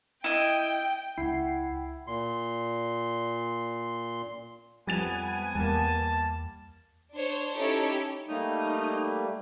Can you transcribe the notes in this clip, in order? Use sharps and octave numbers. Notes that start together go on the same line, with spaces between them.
E4 D#5 G5
C#2 E4 F#5 G5 C7
A#2 C6
F2 G3 B3 G#5 A6 F7
E2 G3 A#3 A5
D4 C5 C#5
C#4 D#4 E4 G4 A4 C#5
G3 A3 A#3 D#4